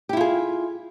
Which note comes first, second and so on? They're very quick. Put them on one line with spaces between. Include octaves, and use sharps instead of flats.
G4 E4 F4 G#4